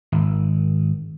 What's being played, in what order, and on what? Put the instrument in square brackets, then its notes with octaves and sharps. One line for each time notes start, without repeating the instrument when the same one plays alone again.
[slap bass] G#1